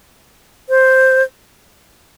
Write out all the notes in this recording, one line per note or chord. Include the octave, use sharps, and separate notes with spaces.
C5